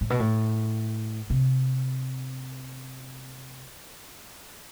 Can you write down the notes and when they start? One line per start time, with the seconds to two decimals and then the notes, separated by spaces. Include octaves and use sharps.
0.01 A2
0.10 B2
0.20 A2
1.30 C3